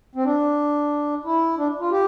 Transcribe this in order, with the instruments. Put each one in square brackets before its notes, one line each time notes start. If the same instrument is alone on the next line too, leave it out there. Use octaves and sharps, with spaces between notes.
[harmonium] C4
D4
E4
D4
F4
G4